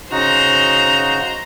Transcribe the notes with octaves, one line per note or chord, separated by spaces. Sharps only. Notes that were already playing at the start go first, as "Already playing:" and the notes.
C#3 D#4 F#4 C5 A#5